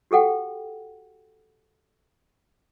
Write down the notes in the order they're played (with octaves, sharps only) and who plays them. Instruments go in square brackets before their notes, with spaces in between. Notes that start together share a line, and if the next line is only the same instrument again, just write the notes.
[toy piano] F#4 G4 A4 F#5 G5